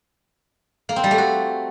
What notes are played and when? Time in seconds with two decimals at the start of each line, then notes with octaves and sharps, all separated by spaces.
0.89 A#3
0.96 C4
1.04 G3
1.11 A3
1.18 F#4